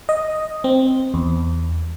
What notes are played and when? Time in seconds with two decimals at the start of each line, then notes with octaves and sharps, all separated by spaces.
0.09 D#5
0.64 C4
1.14 E2